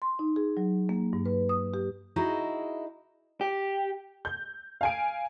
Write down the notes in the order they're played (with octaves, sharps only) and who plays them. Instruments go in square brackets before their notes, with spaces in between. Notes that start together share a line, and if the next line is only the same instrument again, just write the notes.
[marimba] C6
D#4
G#4
F#3
A#3
G2
B4
D#6
G4
[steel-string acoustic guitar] D#4 E4 F#4 G#4 D#5
[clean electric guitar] G4
[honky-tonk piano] G6
F5 G#5 D7